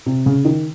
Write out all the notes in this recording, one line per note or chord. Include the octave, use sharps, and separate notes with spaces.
C3
C#3
D#3